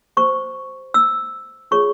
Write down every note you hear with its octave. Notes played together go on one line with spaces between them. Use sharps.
G4 C5 C#6
E6
F4 G#4 C#5 C#6